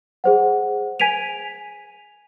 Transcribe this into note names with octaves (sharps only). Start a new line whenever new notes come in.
G#4 C5 F#5
G#5 G#6 B6 D7 D#7 F7